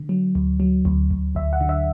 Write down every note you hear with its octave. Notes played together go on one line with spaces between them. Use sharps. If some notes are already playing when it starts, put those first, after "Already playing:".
Already playing: D3
F#3
D2
F#3
D2
D2
D2 E5
F#5
D3
E5